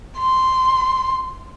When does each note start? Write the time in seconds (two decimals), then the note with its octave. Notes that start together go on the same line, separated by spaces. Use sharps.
0.18 C6